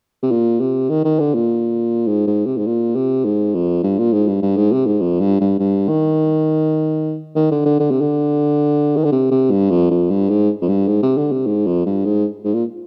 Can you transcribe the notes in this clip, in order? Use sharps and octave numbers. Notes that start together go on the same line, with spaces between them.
C3
A#2
C3
D#3
D#3
D3
A#2
G#2
G#2
C3
G#2
A#2
C3
G#2
F2
G2
A#2
G#2
G2
G2
G#2
C3
G#2
F2
G2
G2
G2
D#3
D#3
D3
D3
D3
C3
D3
D#3
D3
C3
C3
G2
F2
F2
G2
G#2
F2
G2
G#2
C3
D3
C3
G#2
F2
G2
G#2
G#2
A#2